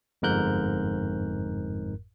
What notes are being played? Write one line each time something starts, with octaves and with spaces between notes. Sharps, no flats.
G1 F2 G#2 A#4 F#6 G6